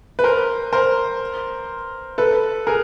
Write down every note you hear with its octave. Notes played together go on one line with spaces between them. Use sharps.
B4
A#4 C5
A#4 C5
A4 B4
G#4 A#4